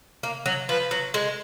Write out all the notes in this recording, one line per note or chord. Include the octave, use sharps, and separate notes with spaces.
A#3
F#3
F3 B4
F#3
G#3